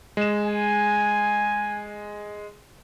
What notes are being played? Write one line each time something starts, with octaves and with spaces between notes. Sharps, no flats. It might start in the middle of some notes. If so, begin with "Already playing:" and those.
G#3 E7
G#5